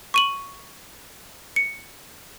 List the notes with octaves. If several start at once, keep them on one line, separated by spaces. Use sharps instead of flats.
C#6 D#7 F#7
C#7